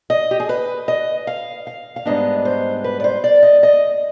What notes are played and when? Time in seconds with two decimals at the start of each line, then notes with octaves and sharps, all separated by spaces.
0.10 D#5
0.31 G4
0.40 G#4
0.49 B4
0.88 D#5
1.27 F5
1.67 F5
1.96 F5
2.06 G#2 G3 B3 D4 D#5
2.45 C5
2.84 B4
3.00 D5
3.04 C5
3.24 D5
3.43 D#5
3.63 D#5